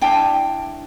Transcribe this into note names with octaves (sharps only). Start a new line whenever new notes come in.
D4 E4 G5 A5